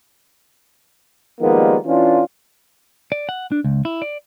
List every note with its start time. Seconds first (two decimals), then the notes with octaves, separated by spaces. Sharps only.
1.40 D#3 F3 G3 G#3 A#3 B3
1.86 E3 C#4 D4 F4
3.12 D5
3.29 F#5
3.52 D4
3.64 C#2
3.85 E4
4.02 D5